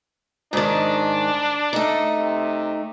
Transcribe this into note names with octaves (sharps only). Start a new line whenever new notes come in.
G#2 D#3 D4
A3 D#4
C3